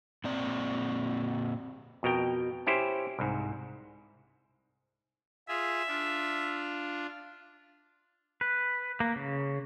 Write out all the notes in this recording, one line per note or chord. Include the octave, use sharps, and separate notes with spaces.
A#2 C4 D5
F2 B2 A#4 G5
C#4 E4 G4 C5
C2 G#2
F4 G#4 E5
D4 F4
B4
A#3
C#3